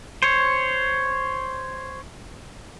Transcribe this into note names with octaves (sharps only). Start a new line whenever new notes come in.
C5 C#5